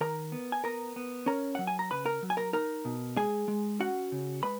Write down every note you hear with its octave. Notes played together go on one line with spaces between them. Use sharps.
D#3 A#4 A#5
B3
G#5
B3 A#4 A#5
B3
C#4 A#4 A#5
F#3 F#5
G#5
A#5
C#3 B4 B5
A#4 A#5
F#3
G#5
A#4 A#5
D#4 A#4 A#5
B2
G#3 G#4 G#5
G#3
C#4 F#4 F#5
C#3
G#3 B4 B5